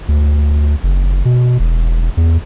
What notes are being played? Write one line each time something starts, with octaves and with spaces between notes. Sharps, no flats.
D2
F#1
B2
E1
E2